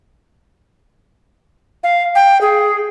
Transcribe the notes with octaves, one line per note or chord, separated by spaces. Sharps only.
F5
G5
G#4